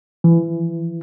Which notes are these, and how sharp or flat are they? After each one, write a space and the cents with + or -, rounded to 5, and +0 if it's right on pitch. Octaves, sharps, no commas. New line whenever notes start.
E3 +25